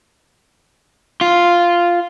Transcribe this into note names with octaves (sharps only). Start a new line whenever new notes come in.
F4